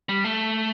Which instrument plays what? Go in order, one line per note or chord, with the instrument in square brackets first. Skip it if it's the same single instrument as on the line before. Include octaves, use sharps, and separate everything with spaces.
[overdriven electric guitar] G3
A3